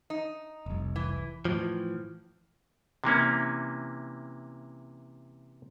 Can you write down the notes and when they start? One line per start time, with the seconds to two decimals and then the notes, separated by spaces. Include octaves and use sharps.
0.10 D#4
0.66 F1 C2
0.96 E3
1.45 A2 E3 F3
3.04 C3 E3 A#3 C#4